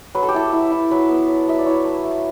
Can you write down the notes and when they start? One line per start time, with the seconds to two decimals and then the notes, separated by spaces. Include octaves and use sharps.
0.15 F#3 B4
0.23 A4
0.29 G4
0.34 E4 A4
0.52 E4
0.71 E4
0.91 F#3 B4
1.09 B3
1.28 F#3
1.47 F#3 E5
1.58 D5
1.66 E4 C#5
1.85 A3
2.04 A3